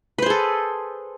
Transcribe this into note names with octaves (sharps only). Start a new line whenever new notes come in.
G#4 A4 B4 C5